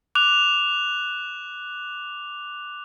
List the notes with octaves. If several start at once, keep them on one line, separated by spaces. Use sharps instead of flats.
D6 F#6 F7